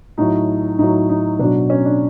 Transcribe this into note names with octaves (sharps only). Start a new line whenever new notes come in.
A2 F#3 D#4
A2 F#3 D#4
D#4
B2 F#3 D4
C#4
D4